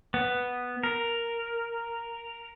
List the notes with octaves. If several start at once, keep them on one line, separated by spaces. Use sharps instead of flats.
B3
A#4